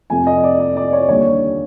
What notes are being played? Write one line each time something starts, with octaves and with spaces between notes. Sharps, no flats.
F2 C3 F3 A3 G#5
D#5
D5
D#5
D5
C#5
D#2 D3 G3 A#3 C#5